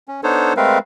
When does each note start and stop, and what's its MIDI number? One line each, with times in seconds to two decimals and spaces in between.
0.08 0.21 61
0.24 0.53 59
0.24 0.53 62
0.24 0.53 63
0.24 0.53 69
0.24 0.53 72
0.24 0.53 73
0.57 0.79 56
0.57 0.79 57
0.57 0.79 60
0.57 0.79 70
0.57 0.79 71
0.57 0.79 77